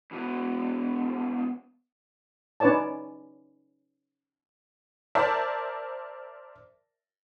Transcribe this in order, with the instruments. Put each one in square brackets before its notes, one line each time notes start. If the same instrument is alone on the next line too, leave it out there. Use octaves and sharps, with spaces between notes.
[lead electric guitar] E2 B2
[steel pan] C#4 D#4 B4 C#5 D5 A5
[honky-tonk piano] A#4 C5 D5 E5 A5